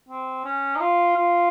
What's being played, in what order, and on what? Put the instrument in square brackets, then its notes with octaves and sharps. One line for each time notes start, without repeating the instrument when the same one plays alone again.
[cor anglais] C4
C#4
D#4
F4
F4